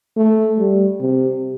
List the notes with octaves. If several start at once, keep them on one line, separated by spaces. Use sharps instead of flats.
A3
G3
C3